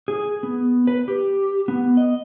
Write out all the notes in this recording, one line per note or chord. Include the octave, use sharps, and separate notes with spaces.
G#4
B3
B4
G4
B3
D#5